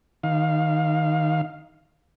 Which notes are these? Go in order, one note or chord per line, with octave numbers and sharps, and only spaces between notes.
D#3 F5